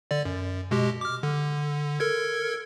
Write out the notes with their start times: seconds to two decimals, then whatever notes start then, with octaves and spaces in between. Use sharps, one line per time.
0.11 D3 D5
0.25 F#2
0.71 B2 G#3 G4
1.01 D6 F6
1.23 D3
2.00 A4 A#4 G#6